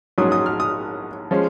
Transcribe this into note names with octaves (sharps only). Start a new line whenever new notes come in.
A#1 G#2 F#3 C#4 D#6
D#6
F6
D#6
F3 G#3 C#4